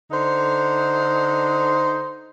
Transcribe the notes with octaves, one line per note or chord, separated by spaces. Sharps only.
D3 D#4 C5